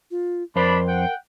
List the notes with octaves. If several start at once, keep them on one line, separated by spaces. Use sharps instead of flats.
F4
F2 D4 A#4 C5 B5
F#5 G5